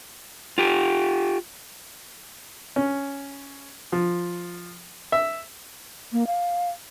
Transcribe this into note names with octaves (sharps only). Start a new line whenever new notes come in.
F4 G4
C#4
F3
E5
A#3
F5